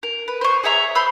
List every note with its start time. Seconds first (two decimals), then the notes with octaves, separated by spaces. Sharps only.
0.03 A#4
0.28 B4
0.41 C5 C#6
0.63 G#4 C#5 E5 A#5
0.95 C5 B5 E6